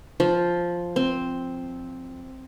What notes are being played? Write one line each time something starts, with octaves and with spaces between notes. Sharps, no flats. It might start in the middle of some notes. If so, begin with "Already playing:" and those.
F3
C4